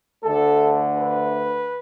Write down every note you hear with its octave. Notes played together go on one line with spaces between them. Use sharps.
D2 D3 A3 A4
B4